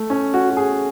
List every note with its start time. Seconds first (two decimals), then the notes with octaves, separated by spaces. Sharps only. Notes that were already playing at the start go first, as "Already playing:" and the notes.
Already playing: A3
0.10 C#4
0.34 F#4
0.50 F#4
0.57 G#4